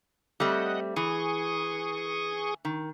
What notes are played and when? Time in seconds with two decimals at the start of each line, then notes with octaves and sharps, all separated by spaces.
0.40 G3 A3 C4 D#5 F#5
0.96 E3 G#4 C#6 D#6
2.65 D#3